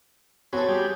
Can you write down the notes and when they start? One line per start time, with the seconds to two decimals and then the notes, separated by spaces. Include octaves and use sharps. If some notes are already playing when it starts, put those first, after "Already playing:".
0.53 B3 C4 F#4 A4 C#5 G#5
0.69 G3 G4 G#4